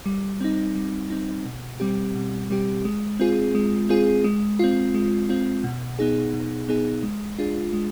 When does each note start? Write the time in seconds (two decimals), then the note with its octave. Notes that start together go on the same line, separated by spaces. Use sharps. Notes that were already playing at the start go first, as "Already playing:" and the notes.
0.06 G3
0.41 C4 D#4
0.75 G3
1.10 C4 D#4
1.45 B2
1.80 G3 C4 G4
2.15 B2
2.50 G3 C4 G4
2.85 G#3
3.20 C4 F4 G#4
3.55 G#3
3.89 C4 F4 G#4
4.24 G#3
4.59 C4 F4
4.95 G#3
5.29 C4 F4
5.64 B2
5.99 B3 D#4 G#4
6.34 B2
6.69 B3 D#4 G#4
7.03 G#3
7.39 D4 F4 G#4
7.73 G#3